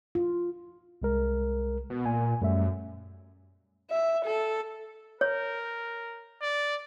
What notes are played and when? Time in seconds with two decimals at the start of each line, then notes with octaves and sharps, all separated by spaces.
0.15 F4
1.02 C2 G#3 A#4
1.90 B2
2.06 A#2 G#5
2.42 F#2 G3 A3 E5
3.91 E5
4.25 A4
5.21 A#4 C#5
6.42 D5